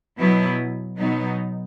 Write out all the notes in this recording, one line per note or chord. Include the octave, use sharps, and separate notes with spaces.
B2 F#3 B3 E4
B2 F#3 B3 D#4